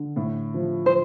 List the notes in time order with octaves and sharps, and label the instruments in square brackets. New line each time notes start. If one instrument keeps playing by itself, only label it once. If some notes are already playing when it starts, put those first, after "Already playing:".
Already playing: [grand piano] D3
A2
F3
[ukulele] C5